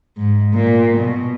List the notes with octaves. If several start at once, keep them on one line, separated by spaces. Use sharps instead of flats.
G#2
A#2
B2